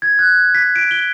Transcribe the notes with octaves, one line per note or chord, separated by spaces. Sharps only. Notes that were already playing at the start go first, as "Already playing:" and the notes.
G#6
F#6
B6
D7
G7